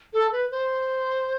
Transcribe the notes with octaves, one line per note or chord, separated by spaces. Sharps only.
A4
B4
C5